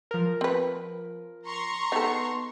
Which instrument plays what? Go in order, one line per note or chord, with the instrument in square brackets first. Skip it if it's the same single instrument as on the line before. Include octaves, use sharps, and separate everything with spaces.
[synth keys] F3 A#4
[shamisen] C4 B4
[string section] A#5 C6 C#6
[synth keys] B3 [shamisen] D#4 A4